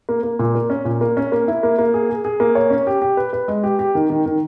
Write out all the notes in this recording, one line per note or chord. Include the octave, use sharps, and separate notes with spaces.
A#3
A#3
A#2
A#3
C#4
A#2
A#3
C#4
A#3
E4
A#3
A#3
G#4
G#4
G#4
A#3
C#5
C#4
G4
G4
B4
B4
G#3
G4
G4
D#3
D#3
D#3